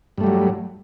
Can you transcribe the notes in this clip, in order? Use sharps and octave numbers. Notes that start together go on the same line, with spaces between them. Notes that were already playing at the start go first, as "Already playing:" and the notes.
G2 F#3 G3 A3